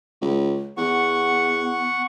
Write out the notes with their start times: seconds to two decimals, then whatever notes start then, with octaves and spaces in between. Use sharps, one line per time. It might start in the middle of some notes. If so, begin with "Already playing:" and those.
0.21 C#2
0.78 E2 B3 F#5 C#6